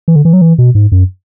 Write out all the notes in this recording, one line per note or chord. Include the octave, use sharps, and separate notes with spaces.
E3
D3
E3
F#3
E3
B2
G#2
F#2